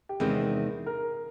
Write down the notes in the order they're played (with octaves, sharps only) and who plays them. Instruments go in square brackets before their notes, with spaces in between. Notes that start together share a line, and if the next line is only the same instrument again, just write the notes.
[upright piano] G4
[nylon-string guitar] E2 C3 D#3 G#3 C4 [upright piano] G#4
[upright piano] A#4